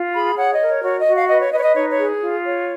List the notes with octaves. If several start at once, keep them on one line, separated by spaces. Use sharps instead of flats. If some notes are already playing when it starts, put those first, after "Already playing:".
Already playing: F4
G#4 B5
C#5 F#5
D#5
A#4
C#5
F#4 C#5
D#5
F#4
F5
B4 D#5
C#5
B4 D#5
C#5
D#5
D#4 C#5
C#5
G#4
F4
C#5